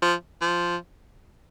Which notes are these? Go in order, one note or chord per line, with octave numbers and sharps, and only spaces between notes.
F3
F3